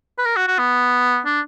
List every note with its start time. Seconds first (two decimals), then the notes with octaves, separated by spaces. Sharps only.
0.18 B4
0.25 A#4
0.36 F#4
0.47 F#4
0.59 B3
1.25 D4